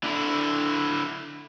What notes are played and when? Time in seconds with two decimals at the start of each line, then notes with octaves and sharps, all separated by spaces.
0.03 D3 E4